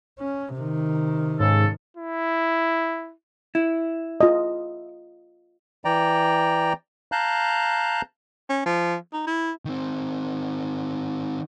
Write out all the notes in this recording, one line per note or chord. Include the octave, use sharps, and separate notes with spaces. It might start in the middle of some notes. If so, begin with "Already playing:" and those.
C#4
C3 D#3
G#2 C#3 A4
E4
E4
F4 D#5
E3 D5 G5 A#5
F5 A5 A#5 F#6 G6
C#4
F3
D#4
E4
D#3 C4